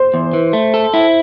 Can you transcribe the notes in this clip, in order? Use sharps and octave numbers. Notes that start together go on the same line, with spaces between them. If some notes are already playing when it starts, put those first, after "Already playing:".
Already playing: C5
E2
E3
A3
A4
E4